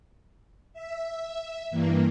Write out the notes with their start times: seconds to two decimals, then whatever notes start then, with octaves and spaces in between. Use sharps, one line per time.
0.73 E5
1.70 G2 E3 A#3